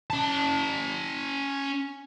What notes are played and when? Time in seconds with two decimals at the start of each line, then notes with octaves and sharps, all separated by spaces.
0.10 C#4 A5